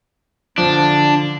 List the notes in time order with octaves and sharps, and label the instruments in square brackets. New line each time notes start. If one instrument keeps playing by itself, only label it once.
[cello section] D3 [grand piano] F3 [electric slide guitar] D4